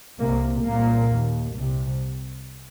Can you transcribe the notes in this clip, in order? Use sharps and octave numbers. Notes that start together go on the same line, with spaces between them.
C2 C3 A#3
C2 A#2 A#3
D#2
C2
C3